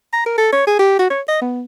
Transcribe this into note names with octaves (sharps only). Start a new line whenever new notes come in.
A#5
A#4
A4
C#5
G#4
G4
F#4
C#5
D#5
B3